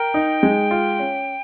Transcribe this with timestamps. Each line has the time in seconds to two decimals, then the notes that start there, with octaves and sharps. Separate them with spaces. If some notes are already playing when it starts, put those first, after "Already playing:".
Already playing: A#4 G5
0.14 D#4
0.43 G#3
0.71 F4
0.99 C#4